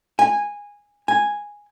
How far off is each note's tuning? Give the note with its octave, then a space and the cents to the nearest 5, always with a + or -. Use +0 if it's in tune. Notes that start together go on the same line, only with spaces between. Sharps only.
G#5 -15
G#5 -5